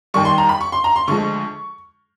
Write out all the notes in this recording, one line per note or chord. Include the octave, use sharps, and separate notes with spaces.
D#2 D#3 G3 C#6
C6
A#5
B5
C#6
C6
A#5
C6
D2 D3 F3 G#3 C#6